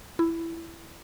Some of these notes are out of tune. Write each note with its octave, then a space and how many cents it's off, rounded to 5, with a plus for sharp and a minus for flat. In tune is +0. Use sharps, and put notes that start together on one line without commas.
E4 +10